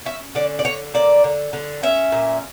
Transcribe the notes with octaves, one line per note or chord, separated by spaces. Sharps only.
C#4 E5
D3 D5
D5
D3 C#5
A#3 D5
D3
D3
C#4 E5
A#2